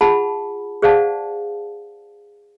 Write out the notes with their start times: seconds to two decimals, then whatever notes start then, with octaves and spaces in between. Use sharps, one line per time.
0.01 F4 G#4 F#5 A5 B5
0.82 G#4 C5 D5 F5 F#5 A5